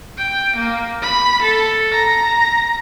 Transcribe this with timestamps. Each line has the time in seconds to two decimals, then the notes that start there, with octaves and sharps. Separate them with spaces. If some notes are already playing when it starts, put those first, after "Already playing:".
0.18 G5
0.57 A#3
1.02 B5
1.43 A4
1.94 A#5